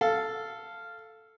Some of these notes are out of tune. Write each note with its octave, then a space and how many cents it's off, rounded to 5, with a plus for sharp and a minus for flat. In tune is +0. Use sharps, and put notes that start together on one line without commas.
A4 +0 F5 -10